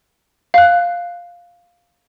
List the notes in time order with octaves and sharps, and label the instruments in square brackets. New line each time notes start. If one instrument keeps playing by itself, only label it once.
[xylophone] F5 F#6